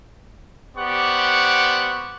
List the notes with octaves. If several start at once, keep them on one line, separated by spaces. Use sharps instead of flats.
B3 G4 C5 D5 F#5 C#6